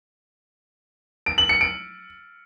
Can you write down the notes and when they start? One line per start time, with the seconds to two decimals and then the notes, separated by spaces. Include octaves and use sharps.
1.26 D7
1.38 F#7
1.49 C#7
1.61 D7